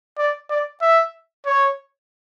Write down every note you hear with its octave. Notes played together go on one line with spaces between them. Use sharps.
D5
D5
E5
C#5